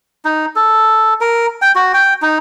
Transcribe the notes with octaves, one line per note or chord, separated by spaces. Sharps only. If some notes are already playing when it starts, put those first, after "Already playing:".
D#4
A4
A#4
G5
F#4
G5
D#4